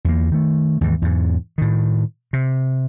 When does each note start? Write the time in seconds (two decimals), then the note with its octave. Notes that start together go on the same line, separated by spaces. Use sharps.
0.05 E2 A#3
0.32 D#3 A3
0.81 D#2 G#2 E3
1.02 E2 G#2
1.58 A2 D#3
2.33 C3